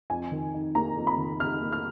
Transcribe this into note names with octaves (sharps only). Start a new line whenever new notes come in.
F2 G#5
D#3
D#4
A#3 A#5
F2
B5
D#3
D#4 F6
A#3
F6